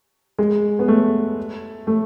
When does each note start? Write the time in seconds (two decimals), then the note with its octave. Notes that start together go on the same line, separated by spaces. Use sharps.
0.39 G#3
0.79 B3
0.88 A3
1.87 A3